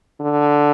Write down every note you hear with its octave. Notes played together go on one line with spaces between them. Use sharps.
D3